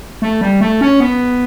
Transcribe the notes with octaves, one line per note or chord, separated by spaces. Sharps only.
A3
G3
A3
C#4
B3